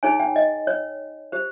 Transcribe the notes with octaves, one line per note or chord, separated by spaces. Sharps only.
D#4 G#4 C#5 G#5
G5
D#5
C#5
G4 C5